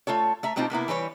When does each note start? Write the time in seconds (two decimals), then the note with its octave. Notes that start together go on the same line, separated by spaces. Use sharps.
0.07 A3 F4 A4 C#5
0.43 A3 E5 A#5
0.56 B2 A3 C4 D#4 F4 G4
0.70 C3 A#3 B3 E4
0.88 E3 G3 B4 C#5